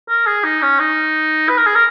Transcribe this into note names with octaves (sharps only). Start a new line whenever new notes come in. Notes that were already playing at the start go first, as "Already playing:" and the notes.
A#4
G#4
D#4
C#4
D#4
B4
A#4
G#4
A#4